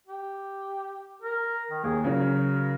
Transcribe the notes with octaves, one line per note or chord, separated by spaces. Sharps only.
G4
A#4
D#3
D#2 G#4
C#3 F#3 A#4